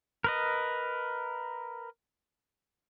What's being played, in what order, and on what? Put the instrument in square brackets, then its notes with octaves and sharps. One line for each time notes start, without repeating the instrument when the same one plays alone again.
[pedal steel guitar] A#4 B4 D#5